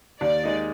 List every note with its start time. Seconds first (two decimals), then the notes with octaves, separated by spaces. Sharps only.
0.21 D#2 D5
0.44 D#3 G#3 D#4